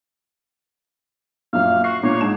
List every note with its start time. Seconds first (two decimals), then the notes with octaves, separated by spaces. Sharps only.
1.53 F#2 A#2 F5
1.84 F#4 C7
2.03 A#2 C#5
2.21 G#2 A5 E7